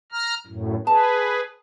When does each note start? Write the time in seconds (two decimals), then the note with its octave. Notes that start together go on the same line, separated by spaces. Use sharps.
0.12 A#5 F6
0.47 F#2 A2
0.87 G#4 B4 A5